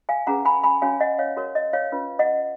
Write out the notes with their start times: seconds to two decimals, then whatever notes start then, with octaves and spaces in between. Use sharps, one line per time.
0.09 F5 G#5
0.27 C#4 G#4 B4 F#5 A#5
0.45 G#5 B5
0.64 G#5 B5
0.82 C#4 F#4 C#5 F5 G#5
1.00 D#5 F#5
1.19 C#5 F5
1.36 F#4 A#4 C#5
1.55 D#5
1.73 C#5 F5
1.92 C#4 F4 B4
2.19 D#5 F#5